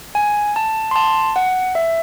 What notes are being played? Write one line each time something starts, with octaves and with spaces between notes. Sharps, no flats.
G#5
A5
C6
A5
F#5
E5